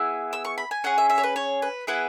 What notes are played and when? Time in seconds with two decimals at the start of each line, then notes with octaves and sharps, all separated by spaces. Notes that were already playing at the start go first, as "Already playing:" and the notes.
Already playing: B3 E4 G#4 E6
0.33 E6
0.45 C#6
0.58 B5
0.71 G#5
0.84 C#4 G#4 F#5
0.98 E5
1.10 E5
1.18 C#5
1.23 B4
1.36 C#5
1.62 B4
1.87 B3 E4 G#4 B4